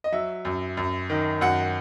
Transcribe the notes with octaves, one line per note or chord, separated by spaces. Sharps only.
D#5
F#3 E5
F#2
F#2
D#3
F#2 F#5